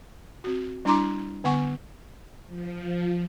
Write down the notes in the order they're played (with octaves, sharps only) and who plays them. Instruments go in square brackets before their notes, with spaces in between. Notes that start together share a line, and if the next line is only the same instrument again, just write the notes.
[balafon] C4 F#4
G3 D4 E4 A#5 C6 D6
D3 B3 F#5 G#5 C#6
[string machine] F3